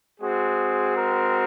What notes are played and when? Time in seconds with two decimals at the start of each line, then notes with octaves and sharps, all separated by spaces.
0.20 G#3 C4 F#4 G#4
0.96 A#4